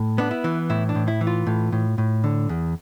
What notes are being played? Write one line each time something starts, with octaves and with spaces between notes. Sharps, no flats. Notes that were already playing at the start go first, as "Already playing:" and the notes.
Already playing: A2
B3 D4
E4
E3
A2 E4
D4
A2
E4
E3
F4
A2
A2
A2
D3
E2